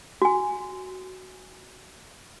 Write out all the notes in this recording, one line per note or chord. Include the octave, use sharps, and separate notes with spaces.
F#4 G#5